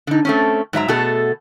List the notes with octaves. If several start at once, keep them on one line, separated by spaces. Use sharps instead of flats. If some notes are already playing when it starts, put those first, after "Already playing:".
D3 D#4
A3 C4 C#4
G#2 F#3 E5 A#5
B2 A3 F#4 G#4 A4